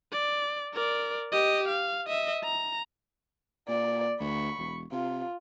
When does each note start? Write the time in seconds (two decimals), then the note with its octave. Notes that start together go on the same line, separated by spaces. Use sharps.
0.12 D5
0.73 A#4 D5
1.32 G4 D#5
1.68 F5
2.07 D#5 E5
2.44 A#5
3.68 A#2 D5
4.20 D2 B5 C#6
4.59 E1
4.92 C3 F4